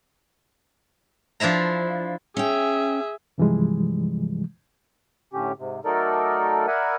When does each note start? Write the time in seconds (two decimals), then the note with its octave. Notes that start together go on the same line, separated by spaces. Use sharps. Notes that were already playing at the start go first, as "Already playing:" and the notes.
1.40 F3 D4 E4 E5 A#5
2.37 C#4 G#4 E5 G5
3.38 G2 C3 E3 F3 G3 G#3
5.33 A2 D3 C#4 G4
5.58 G#2 C3
5.85 F#3 A3 D#4 A4 A#4 D5
6.67 A#4 D5 E5 F#5 G#5 B5